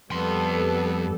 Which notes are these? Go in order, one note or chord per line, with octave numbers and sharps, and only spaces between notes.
F2 G3 B3 A4 C6